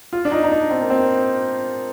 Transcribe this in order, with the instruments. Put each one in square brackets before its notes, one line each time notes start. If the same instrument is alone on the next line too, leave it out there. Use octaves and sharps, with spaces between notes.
[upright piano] F4
D4
D#4
D#4
D4
C4
A#3
C4